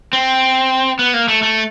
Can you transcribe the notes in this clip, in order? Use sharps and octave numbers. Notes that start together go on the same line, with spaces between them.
C4
B3
A#3
A3
A3